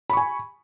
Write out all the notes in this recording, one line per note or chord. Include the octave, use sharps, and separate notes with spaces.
G#5 B5 C#6